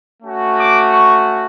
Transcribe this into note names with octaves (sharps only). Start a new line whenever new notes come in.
A3 C#4 F#4
D6
C#6